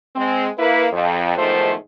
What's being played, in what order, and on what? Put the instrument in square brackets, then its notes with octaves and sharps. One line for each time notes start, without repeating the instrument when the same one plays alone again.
[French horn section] G#3 C4
A#3 E4 B4
F2
E2 G#2 D#3 F3 A3 C5